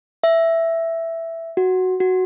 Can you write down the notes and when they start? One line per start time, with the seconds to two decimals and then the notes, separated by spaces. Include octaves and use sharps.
0.24 E5
1.57 F#4
2.00 F#4